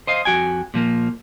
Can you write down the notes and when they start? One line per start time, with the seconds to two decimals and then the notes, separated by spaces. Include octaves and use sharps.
0.07 C5 D#5 F5
0.25 F2 F#4 G5 G#5
0.74 A#2 F3 A#3